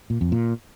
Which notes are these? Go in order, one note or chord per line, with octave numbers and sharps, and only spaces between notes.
A#2
F2
A#2